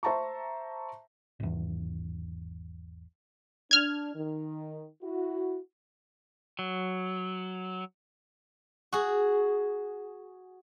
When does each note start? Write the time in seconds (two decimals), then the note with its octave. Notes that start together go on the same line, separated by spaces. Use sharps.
0.03 C5 E5 A5 A#5 C#6
1.40 G#1 E2
3.71 D4 F6 G#6
4.15 D#3
5.02 E4 F#4
6.59 F#3
8.93 F#4 G#4